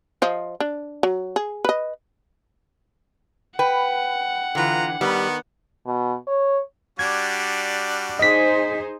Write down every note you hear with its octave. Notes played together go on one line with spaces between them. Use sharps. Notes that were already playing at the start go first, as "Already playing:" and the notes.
F3 C5 D#5
D4
F#3
G#4
B4 D#5
B4 F#5 G5
D3 E3 F4 B4 A#5
D#3 G3 B3
B2
C#5
G3 D4 F#4 G#6
D#4 G#4 C5 D#5 B6